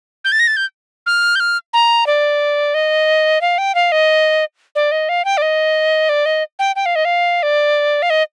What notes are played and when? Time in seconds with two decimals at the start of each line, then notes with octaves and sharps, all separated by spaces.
0.25 G6
0.32 A6
0.40 A#6
0.47 A6
0.57 G6
1.06 F6
1.35 G6
1.40 F6
1.73 A#5
2.07 D5
2.74 D#5
3.41 F5
3.58 G5
3.75 F5
3.92 D#5
4.75 D5
4.92 D#5
5.09 F5
5.25 G5
5.37 D5
5.42 D#5
6.09 D5
6.26 D#5
6.59 G5
6.76 G5
6.86 F5
6.96 D#5
7.05 F5
7.43 D5
8.02 F5
8.10 D#5